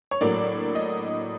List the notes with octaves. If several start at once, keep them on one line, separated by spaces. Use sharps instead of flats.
C#5
A2 F#3 A#3 D4 D5
D#5